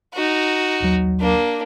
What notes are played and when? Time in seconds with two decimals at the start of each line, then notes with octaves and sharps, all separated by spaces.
0.14 D#4 F#4
0.80 A#1 D#2 F#3
1.20 A#3 D4